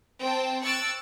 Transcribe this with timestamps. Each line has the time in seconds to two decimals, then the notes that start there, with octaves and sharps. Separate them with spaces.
0.21 C4 C5 G5 A5
0.62 C#6 E6 F#6 A6 D7